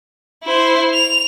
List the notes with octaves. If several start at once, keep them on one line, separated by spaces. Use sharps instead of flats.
E4 C5
F7